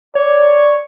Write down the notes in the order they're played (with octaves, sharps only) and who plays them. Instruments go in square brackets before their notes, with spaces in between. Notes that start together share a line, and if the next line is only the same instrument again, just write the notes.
[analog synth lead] C#5 [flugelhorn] D5